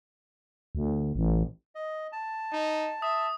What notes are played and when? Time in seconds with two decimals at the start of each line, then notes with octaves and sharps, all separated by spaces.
0.75 D2
1.15 A1
1.75 D#5
2.12 A5
2.52 D#4
3.02 E5 D#6